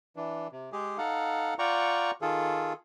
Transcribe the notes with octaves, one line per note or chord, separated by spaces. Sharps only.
E3 D4
C3
G#3 G4 G#4
D#4 A4 F5 F#5
F4 D5 F#5 G5 A#5 C#6
D#3 F4 G#4 A4